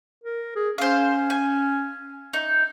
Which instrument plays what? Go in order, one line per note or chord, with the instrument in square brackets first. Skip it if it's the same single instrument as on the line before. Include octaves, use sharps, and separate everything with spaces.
[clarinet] A#4
G#4
[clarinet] C#4 [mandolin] C5 F5
[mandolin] G#5
D#4